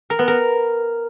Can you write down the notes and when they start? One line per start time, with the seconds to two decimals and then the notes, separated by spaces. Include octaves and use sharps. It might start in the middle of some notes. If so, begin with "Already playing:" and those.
0.10 A#4
0.19 B3
0.28 A#4